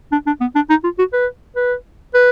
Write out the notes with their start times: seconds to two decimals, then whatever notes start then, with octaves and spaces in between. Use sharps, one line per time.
0.12 D4
0.27 D4
0.41 B3
0.55 D4
0.70 D#4
0.84 F4
0.99 F#4
1.13 B4
1.56 B4
2.14 B4